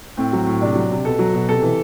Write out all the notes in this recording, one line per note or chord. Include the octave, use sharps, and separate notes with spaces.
A2 C4
F#3
A2
C3 D4
F#3
C3
B2 A4
F#3
B2
C3 A4
E3